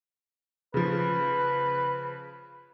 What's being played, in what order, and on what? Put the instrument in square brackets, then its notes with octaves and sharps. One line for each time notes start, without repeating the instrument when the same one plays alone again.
[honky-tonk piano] C#3 F3 [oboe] B4